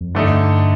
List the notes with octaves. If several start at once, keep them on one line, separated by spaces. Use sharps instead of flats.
F2
G2 D3 A3 D#4